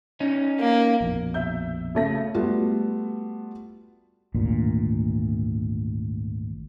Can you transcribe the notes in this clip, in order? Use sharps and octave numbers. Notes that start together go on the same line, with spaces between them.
C#4 D#4
A#3
A#1 F2 B2
E5 G6
C#3 A3 A#6
G3 A3 B3 F4 F#4
G#1 D2 A#2